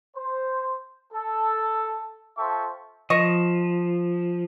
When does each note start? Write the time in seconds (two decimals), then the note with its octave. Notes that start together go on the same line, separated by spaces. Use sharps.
0.17 C5
1.13 A4
2.38 F4 A4 C5 E5 G5 C#6
3.10 F3 D#5 C#6